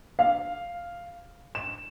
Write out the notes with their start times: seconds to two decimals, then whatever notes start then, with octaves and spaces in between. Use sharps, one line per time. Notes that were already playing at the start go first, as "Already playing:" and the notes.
0.19 F5
1.55 E7